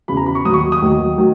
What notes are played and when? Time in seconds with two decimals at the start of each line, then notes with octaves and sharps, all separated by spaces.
0.08 E2 C#3 E3 B5
0.17 A#5
0.26 B5
0.35 C#6
0.45 D#2 D#3 F#3 D#6
0.54 C#6
0.72 D#6
0.82 D#2 D#3 F#3
1.18 D#3 F#3